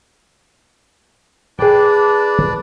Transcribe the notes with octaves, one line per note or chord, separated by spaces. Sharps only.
D4 G#4 B4 D5 G5